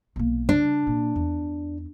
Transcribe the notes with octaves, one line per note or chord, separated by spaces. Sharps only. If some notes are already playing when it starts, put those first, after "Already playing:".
B1 A#3
C#3 D4
A#2 A#3
E2